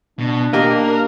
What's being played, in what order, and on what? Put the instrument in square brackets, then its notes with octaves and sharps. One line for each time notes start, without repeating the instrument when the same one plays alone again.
[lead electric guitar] B2 [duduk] D4
[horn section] A#3 [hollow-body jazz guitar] G4 D#5 [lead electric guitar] A#4